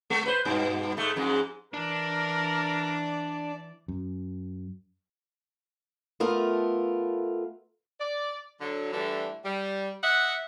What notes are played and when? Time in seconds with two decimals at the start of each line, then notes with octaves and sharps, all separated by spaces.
0.10 G#3
0.26 B4 C5
0.45 G2 B2
0.97 G#2 A3
1.16 F2 G#2 G#3
1.74 E3 D4 A#4 D5
3.88 F#2
6.20 A3 B3 F4 A#4
8.01 D5
8.61 D3 F#3
8.92 D3 E3 G3 A3
9.44 G3
10.03 D#5 E5 F#5